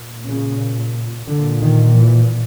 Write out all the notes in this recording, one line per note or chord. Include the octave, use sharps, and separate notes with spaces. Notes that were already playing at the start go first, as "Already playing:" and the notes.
Already playing: A#2
C#3
A#2 D3
D#3
E3